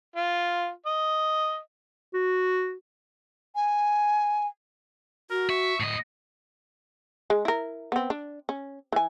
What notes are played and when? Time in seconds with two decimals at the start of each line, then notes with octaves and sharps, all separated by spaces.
0.16 F4
0.86 D#5
2.14 F#4
3.55 G#5
5.30 F#4 A#4
5.49 E5 C#6
5.80 A2 D#5
7.30 G#3
7.45 E4 A#4
7.92 B3 C4
8.10 D4
8.49 C#4
8.92 E3 G#5